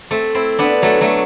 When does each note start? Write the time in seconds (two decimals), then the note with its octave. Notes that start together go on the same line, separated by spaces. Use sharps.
0.11 A3 C4
0.35 C4 E4
0.59 B3 D4
0.82 F#3 A3
1.01 F#3 A3